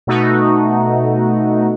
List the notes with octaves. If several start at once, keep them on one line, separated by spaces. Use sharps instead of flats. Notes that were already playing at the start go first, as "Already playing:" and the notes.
B2 A3 D#4 F#4